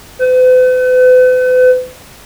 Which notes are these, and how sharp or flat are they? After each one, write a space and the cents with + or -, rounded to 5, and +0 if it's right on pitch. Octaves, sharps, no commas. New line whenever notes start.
B4 +45